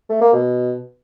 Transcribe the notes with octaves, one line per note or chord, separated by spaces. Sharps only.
A3
A#3
B2